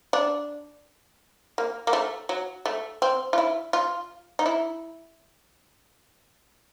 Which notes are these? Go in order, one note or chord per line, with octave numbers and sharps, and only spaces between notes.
D4
A#3
A#3
A3
F#3
A3
C4
F4
E4
F4
D#4
E4